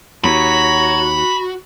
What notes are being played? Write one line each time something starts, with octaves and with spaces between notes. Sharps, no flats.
D#2 F#4 C#5 A#5 B5